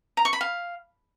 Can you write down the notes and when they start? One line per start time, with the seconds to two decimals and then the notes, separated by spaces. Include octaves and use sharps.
0.17 A#5
0.25 C#6
0.33 B5
0.41 F5